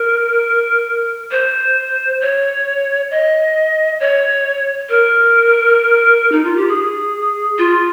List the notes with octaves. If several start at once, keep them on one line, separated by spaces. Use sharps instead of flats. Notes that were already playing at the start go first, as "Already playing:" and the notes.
Already playing: A#4
C5
C#5
D#5
C#5
A#4
D#4
F4
G4
G#4
F4